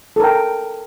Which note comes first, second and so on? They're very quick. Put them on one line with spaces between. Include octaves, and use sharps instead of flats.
A4 A#4 G5